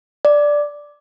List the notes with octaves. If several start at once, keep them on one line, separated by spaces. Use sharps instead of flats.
D5